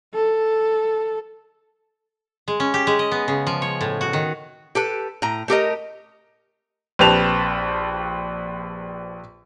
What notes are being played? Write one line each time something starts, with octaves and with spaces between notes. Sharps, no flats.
A4
G#3
C#4
G4
G#3
D#5
B3
C#3
F3
C#5
A2
F#4
D#3
G4 A4 B4
A2 A#5
A3 G4 A#4 D#5
A#1 C4 G4 B4 A5 F7